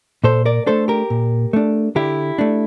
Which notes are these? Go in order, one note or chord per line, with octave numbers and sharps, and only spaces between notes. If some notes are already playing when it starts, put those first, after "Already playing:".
A#2 A4 C5
A#4 D5
A3 D4 A4 C5
G4 A#4
A#2
A3 D4
D3 E4 G4
A3 D4